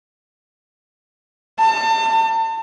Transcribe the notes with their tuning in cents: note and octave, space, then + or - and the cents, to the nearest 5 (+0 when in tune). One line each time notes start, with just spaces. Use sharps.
A5 +35